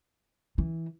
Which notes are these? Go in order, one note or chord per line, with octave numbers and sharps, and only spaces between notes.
E3